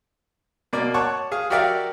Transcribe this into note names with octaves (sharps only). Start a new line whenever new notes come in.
B2 A#3 D5
C#5 F#5 A5 C#6 D6
G#4 F5
F#4 G4 A#4 D5 E5 F5